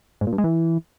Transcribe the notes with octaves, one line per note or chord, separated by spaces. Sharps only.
G#2
A#2
G2
G#3
E3